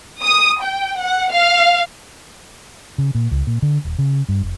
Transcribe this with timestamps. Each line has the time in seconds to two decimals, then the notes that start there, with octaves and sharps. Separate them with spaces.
0.23 D#6
0.63 G5
1.00 F#5
1.32 F5
2.98 C#3
3.15 A#2
3.31 C#2
3.47 A#2
3.62 D3
3.85 D#1
3.99 C#3
4.29 G2
4.41 F1